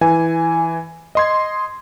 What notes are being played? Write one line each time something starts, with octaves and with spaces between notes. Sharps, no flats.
E3 G#5
D#5 C6 G#6